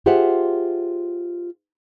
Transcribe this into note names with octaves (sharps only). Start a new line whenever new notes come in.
F4 G4 G#4 C5 E5 F#5